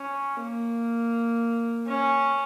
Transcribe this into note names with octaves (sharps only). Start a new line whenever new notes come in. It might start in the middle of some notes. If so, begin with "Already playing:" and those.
Already playing: C#4
A#3
C#4